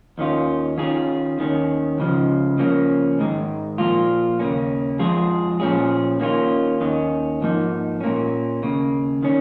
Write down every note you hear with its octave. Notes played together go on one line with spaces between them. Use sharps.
D#2 D#3 C#4 F4
D#3 C#4 F4 G#4
D#2 D#3 C#4
C#2 C#3 F3
C#3 F3 A#3 C#4
G#2 D#3 G#3
A#2 F3 A#3 F4
D#2 C#3 A#3 C#4
F2 F3 G#3 F4 G#4
A#2 F3 C#4 G#4
D#3 A#3 C#4 F4
D#2 D#3 C#4
G#2 F3 A#3 D#4
A#2 A#3 C#4
D#2 C#3 A#3
D#3 C#4